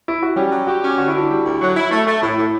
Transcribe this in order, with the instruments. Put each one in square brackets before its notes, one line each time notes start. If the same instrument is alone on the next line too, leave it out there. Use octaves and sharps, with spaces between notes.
[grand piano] E4
F#4
[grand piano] G3 G4 [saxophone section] C#4
[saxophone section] F#3
[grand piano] F#4 [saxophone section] G4
[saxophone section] C#4
[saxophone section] D3 [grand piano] F#4
[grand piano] E4
[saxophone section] D4 [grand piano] F#4
[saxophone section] G3
D2
F#3
E4
A3
A3
[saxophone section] A2 [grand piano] E4
[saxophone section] A2